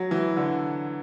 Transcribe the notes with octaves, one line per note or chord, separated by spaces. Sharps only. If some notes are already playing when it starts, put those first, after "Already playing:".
Already playing: F#3
E3
D3